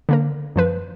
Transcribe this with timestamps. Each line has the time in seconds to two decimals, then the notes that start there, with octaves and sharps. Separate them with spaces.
0.09 D3 A#3 A#4
0.56 F#2 F3 B4